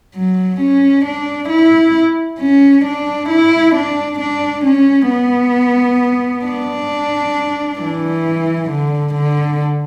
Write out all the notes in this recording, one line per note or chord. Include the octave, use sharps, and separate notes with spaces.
F#3
C#4
D4
E4
C#4
D4
E4
D4
D4
C#4
B3
D4
E3
D3
D3